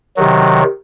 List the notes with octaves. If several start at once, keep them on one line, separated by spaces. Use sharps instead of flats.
C3 D#3 F#3